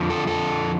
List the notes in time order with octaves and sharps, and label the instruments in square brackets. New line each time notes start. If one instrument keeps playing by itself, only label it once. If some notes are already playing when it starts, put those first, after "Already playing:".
Already playing: [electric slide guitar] F2 D3 F3
A4
A4